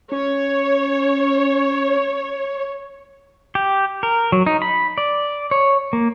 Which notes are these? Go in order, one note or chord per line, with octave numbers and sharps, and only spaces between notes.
C#4 C#5
G4
A#4
F#3
D#4
B5
D5
C#5
A#3